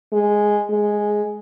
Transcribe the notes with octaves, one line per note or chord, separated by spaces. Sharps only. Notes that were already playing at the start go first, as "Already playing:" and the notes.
G#3
G#3